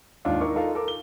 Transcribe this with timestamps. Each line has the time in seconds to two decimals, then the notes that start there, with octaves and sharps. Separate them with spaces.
0.25 D#2 G#2 D4 D#4 F4 F5
0.40 D#4 E4 A#4 C#6 D6
0.55 D#4 F4 A4 A#4 F5
0.75 A4 A#4 D6
0.88 G7